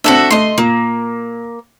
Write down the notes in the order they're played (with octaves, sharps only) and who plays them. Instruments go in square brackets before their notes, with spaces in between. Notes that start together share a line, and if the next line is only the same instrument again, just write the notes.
[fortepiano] C4 D4 [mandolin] F#4 A4 E5
[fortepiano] A3 [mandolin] D#5 C6
[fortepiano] A#2 [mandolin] A#3